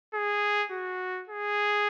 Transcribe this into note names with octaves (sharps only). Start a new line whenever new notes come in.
G#4
F#4
G#4